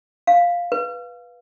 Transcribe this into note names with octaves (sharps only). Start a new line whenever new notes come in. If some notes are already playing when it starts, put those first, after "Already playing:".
F5
B4